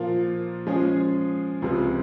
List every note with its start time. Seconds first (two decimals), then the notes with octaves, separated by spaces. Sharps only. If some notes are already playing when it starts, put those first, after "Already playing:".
Already playing: A#2 F3 A#3 F4
0.67 F3 G#3 C#4 G#4
1.62 C#2 C3 F3 G#3